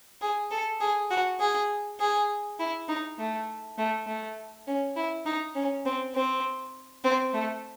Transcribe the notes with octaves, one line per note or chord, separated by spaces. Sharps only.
G#4
A4
G#4
F#4
G#4
G#4
E4
D#4
A3
A3
A3
C#4
E4
D#4
C#4
C4
C4
C4
A3